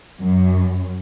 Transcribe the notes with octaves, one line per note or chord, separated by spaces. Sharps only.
F#2